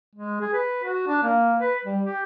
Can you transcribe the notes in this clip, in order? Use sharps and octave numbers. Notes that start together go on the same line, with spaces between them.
G#3
G#4
B4
F#4
D4
A#3
B4
G3
G4